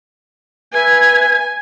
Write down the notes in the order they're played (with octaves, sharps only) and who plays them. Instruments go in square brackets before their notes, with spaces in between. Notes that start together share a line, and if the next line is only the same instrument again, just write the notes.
[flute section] B4 E5 G#6 [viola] G#5